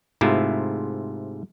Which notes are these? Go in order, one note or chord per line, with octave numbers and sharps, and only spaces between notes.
G#2 C3 A3 E4 F4